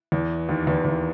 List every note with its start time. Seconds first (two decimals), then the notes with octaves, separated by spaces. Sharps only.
0.12 E2 E3
0.49 D#2 D#3
0.67 E2 E3
0.85 E2 E3